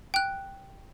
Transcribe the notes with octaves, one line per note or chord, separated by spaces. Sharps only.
G5 F#6